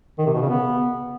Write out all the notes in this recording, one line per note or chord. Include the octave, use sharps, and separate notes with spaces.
D#3
C3
B2
C#3
B3